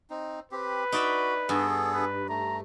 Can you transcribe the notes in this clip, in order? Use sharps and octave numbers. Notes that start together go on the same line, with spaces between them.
C4 D#4
C4 G4 B4
D#4 F#4 D5 E5
G2 B3 G#4 A4
B4
A3 A#5